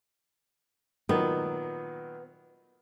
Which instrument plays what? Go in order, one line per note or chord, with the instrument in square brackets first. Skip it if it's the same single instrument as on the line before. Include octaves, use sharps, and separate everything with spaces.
[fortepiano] A#2 D#3 F#3 [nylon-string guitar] B3